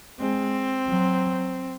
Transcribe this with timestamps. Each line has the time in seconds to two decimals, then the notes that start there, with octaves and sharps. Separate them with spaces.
0.19 G#3 C4
0.89 F#3